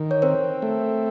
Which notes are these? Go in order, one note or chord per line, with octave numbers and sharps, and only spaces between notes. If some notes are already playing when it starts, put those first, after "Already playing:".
Already playing: D#3
C#5
C4 A#4 C5
A3